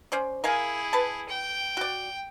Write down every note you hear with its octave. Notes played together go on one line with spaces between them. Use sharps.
C#4 C5 D5
E4 G#4 A#4 F5 G#5
B4 A5
G5
F#4 D5